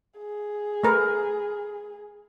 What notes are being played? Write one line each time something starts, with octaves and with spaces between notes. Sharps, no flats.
G#4
A3 A#4 B4